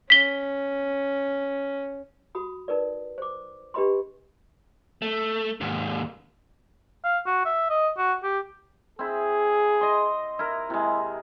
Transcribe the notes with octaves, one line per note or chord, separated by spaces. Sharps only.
C#4 B6 G7
F#4 B5 D#6
D#4 A#4 B4 D5
C5 D6
D4 G4 B4 D#5 B5 C6
A3
D#2 G#2
F5
F#4
E5
D#5
F#4
G4
C4 E4 G#4
D#5 C6
E4 A#4
C3 G#3 E4